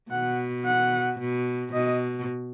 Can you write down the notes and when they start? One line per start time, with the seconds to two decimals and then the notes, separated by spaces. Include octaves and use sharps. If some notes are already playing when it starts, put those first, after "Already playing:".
0.11 B2 F#5
0.65 F#5
1.20 B2
1.73 B2 D#5